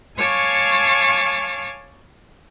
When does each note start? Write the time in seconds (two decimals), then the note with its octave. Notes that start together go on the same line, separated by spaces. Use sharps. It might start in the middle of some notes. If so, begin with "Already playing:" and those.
0.19 C#5 F5 G#5 A5 C#6 D6